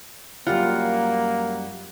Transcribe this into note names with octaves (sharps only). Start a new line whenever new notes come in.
F#2 G3 A#3 F4 F#5